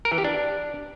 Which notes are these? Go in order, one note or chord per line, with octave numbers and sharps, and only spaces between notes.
A#4
E3
G4
D4